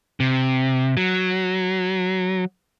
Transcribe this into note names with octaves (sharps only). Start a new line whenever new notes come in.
C3
F#3